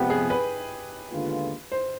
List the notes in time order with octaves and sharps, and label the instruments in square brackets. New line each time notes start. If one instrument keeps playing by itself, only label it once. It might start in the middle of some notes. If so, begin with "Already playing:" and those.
Already playing: [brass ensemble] F2 C3 F3 G#3 B3 [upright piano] G4
[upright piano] G#4
B4
[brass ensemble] D#2 D3 G#3 B3 F4
[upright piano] C5